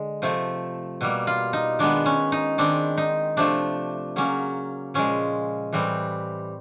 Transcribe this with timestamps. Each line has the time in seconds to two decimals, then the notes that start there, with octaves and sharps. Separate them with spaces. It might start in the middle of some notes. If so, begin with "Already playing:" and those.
Already playing: D3 G#3
0.22 C3 F3 A3
1.01 B2 G3 A#3
1.27 F4
1.53 D#4
1.79 D#3 G#3 B3 D4
2.06 C#4
2.32 D#4
2.58 D#3 G#3 C4 D4
2.98 D#4
3.37 C3 F3 A3 D4
4.16 C#3 F#3 A#3 C#4
4.94 A#2 F3 G#3 C#4
5.73 A2 E3 G3 C4